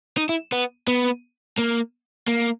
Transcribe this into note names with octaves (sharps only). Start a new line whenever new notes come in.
D#4
E4
B3
B3
A#3
A#3